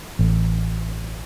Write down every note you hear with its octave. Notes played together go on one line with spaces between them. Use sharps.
A1